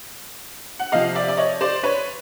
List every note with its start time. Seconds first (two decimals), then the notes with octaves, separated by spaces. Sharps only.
0.79 F#5
0.92 C3 F3 D#5 F5
1.15 D5 E5
1.29 D5
1.38 C#5 D#5
1.61 C5 D5
1.83 B4 C#5